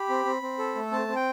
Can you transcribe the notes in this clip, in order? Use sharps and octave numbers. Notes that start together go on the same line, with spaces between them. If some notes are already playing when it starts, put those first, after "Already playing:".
Already playing: G4 B5
C4
C4
C4
A4
A3
C4 A5
C4
G5